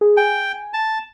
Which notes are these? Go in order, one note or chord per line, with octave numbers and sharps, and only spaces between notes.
G#4
G5 G#5
A5